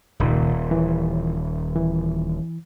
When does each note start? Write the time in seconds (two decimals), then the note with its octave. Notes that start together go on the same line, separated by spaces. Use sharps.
0.20 D#1 C#2 A#2 D#3
0.71 E3
1.75 E3